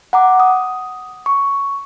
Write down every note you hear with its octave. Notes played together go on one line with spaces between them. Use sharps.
F#5 A#5 D6
D#6
C#6